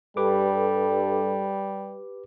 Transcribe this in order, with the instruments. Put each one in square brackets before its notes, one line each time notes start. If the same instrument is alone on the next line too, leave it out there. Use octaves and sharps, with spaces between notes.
[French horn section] G2 A4 [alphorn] G3 [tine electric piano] G4 B4 D6